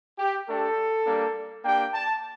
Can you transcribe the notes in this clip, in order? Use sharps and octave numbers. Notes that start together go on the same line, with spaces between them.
G4
A3 D4 G4 A4
G3 A#3 D4
A#3 D4 G4 G5
A5